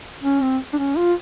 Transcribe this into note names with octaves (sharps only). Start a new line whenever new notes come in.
C#4
C4
D4
C#4
F4